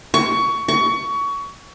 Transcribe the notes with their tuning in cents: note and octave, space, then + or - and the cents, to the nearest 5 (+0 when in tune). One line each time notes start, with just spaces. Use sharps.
C#6 +20
C#6 +25